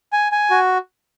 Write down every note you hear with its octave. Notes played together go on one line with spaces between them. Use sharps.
G#5
G#5
F#4